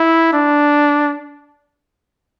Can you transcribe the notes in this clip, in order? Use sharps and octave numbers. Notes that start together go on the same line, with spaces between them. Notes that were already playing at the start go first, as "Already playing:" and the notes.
Already playing: E4
D4